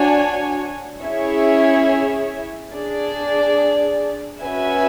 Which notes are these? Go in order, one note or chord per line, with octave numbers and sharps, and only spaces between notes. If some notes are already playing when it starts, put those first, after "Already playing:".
Already playing: D4 F#4 C#5 G#5
C#4 E4 G#4 C#5 E5
D4 G#4 D5
C#4 F#4 B4 E5 G#5